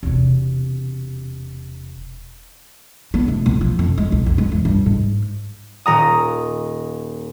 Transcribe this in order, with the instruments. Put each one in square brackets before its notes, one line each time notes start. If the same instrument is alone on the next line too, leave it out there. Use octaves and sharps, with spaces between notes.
[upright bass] E1 C3
B3
F1
B1
F3
F2
G#3
B1
F2
G#3
E2
G2
G#2
[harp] D#1 A#5 D#6